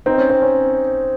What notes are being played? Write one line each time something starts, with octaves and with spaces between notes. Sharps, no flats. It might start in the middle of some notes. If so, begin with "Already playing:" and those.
C4 D#4
C#4
C4
C#4